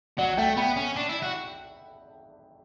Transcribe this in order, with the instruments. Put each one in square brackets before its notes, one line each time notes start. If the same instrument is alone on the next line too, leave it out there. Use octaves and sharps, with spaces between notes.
[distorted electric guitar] F#3 [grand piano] D5 F#5
[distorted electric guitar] A3 [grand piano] E5 G5
[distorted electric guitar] B3 [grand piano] G5 B5
[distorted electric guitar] C#4
D4
E4
F#4